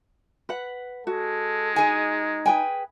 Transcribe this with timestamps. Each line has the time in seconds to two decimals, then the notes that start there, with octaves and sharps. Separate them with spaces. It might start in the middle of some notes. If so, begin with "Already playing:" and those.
0.49 B4 F#5
1.07 G#3 F#4 A4
1.76 D#4 G#4 G#5
2.46 G#4 B4 G5 G#5